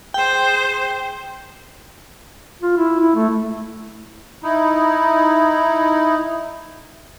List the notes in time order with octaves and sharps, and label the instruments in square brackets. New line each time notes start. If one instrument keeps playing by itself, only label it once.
[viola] G#4 C5 [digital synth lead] G5
[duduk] F4
E4
E4
A3
[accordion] D#4 E4